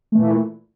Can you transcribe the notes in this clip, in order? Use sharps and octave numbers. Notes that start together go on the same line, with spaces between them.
A#2 E3 A3